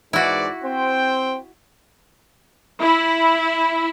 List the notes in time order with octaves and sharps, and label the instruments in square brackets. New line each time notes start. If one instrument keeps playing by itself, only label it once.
[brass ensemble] G#2 E3 D5 [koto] E4 F#4
[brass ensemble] C4 C5 G5
[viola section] E4